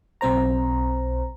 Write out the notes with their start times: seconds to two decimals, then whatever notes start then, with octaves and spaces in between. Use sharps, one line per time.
0.21 B1 C4 C5 A#5